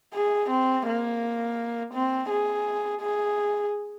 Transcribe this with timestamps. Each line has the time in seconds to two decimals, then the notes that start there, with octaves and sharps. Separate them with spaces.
0.14 G#4
0.50 C4
0.86 A#3
1.94 C4
2.30 G#4
3.01 G#4